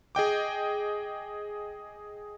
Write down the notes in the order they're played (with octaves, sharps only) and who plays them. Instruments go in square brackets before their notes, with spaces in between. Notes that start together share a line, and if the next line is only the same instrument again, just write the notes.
[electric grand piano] G#4 D#5 G5 D6